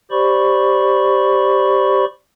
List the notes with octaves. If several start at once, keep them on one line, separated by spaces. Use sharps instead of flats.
G4 C5 D5 B5 C#6